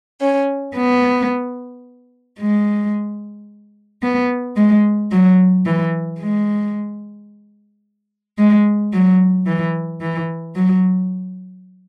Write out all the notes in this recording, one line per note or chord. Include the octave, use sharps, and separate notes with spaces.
C#4
B3
G#3
B3
G#3
F#3
E3
G#3
G#3
F#3
E3
E3
F#3